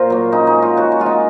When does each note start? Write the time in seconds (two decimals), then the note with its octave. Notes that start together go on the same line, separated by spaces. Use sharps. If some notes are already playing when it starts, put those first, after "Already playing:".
Already playing: A#2 F4 A#4 C5
0.10 F#3 A#3
0.32 C#3 D#4
0.47 D#4
0.55 G#3
0.62 F4
0.77 C#3 F#4
0.92 F#4
1.00 G#3 F4
1.06 D#4